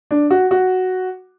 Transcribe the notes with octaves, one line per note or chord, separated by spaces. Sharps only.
D4
F#4
F#4